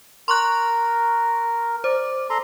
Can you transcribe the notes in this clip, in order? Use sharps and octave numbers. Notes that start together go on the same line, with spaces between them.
A#4 C6 C#6 F#6
C5 D5
A4 A#5 C6